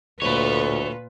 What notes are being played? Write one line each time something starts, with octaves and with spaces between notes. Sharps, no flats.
D2 A#2 F4 A4 B4 C#5